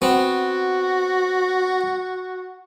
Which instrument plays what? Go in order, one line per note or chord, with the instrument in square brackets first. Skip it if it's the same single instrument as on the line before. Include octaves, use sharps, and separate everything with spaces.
[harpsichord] B3 C4 [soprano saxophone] F#4